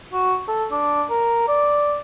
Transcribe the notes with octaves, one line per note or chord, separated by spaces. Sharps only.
F#4
A4
D4
A#4
D5